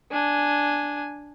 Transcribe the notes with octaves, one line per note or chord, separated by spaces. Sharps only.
D4 G#5